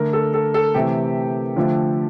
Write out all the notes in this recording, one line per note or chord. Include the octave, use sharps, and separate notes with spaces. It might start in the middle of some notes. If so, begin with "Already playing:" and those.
Already playing: D3 A3 A#4
A4
A4
A4
C3 E3 A3 G4
D3 F3 A3